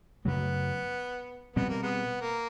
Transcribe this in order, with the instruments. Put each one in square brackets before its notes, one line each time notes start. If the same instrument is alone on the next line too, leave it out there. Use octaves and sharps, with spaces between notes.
[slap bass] F#2 C#3 F#3 A3 [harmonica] B3
[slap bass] B2 G3 C4 [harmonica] B3
[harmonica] A#3
G#3 B3
A#3